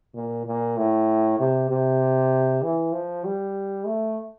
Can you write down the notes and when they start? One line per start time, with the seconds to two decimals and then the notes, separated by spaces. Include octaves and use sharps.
0.15 A#2
0.46 A#2
0.77 A2
1.39 C3
1.70 C3
2.62 E3
2.93 F3
3.24 G3
3.86 A3